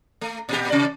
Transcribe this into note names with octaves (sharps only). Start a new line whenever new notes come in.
A3
A#2 G4
C3 D5